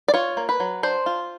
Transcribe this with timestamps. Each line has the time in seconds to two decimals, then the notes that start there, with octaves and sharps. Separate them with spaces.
0.08 D5
0.14 F4 C#5
0.37 A#3
0.49 B4
0.60 F#3
0.83 D4 C5
1.06 F4